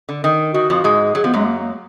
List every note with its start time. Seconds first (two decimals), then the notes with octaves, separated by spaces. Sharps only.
0.09 D3
0.24 D#3
0.54 D#3 F#4
0.70 F2 F3
0.84 G#2 G#3
1.15 F#3 G#4
1.24 F3 B3
1.34 F#2 F#3 G#3
1.45 A#3
1.60 A#3